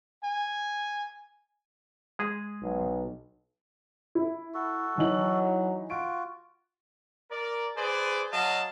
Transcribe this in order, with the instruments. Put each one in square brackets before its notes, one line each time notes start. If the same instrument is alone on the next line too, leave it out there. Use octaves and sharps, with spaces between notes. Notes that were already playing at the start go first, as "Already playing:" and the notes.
[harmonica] G#5
[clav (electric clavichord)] G#3 G#4
[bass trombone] B1
[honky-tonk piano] E4
[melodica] F#4 A4
[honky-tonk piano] E3 D#4 F#7 [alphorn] F#3
[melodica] F4 F#4 [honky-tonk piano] D7
[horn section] A#4 D5
G#4 B4 C5 D5
F#3 D#5 F5 A5